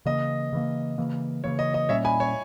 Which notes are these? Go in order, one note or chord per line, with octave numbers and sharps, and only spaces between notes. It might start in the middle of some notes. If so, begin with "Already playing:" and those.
C#3 E3 A#3 D#5
C#3 E3 A#3
C#3 E3 A#3
C#3 E3 A#3 C#5
D#5
D#5
A#2 G3 A#3 C#4 C#5 E5
G#5 B5
C#5